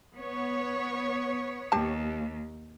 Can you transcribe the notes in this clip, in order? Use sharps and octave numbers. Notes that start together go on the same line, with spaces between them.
B3 C#5
D#2 G4 A5